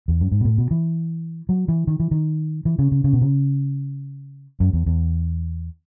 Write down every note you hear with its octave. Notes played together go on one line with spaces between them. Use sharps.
E2
F#2
G#2
B2
A2
B2
E3
F#3
E3
D#3
E3
D#3
E3
C#3
C#3
C#3
B2
C#3
F#2
E2
E2